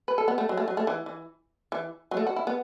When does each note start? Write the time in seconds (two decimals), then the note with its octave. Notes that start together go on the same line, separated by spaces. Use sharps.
0.08 B4
0.18 A4
0.28 B3
0.38 A3
0.49 F#3
0.57 A3
0.68 F#3
0.77 A3
0.87 E3
1.06 E3
1.72 E3
2.11 F#3
2.17 A3
2.27 F#4
2.36 E4
2.47 B3